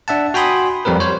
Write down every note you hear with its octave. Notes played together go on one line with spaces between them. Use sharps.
D4 E5 F#5 A5
F#4 G5 G#5 B5 C6 D#6
F2 G3 C4 A#4 B4
C5 C#5